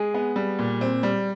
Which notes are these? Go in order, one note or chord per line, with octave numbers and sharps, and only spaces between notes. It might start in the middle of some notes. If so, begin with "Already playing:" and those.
Already playing: G#3 G#4
B3
G3
A#2
C4
G3